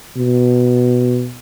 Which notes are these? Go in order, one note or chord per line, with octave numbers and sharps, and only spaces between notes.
B2